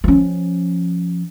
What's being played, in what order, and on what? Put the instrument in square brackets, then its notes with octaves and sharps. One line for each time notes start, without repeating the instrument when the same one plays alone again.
[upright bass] F3 C#4